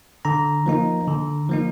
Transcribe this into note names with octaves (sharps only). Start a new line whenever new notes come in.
D3 A#5
F3 A#3 D#4
D3
F3 A#3 D#4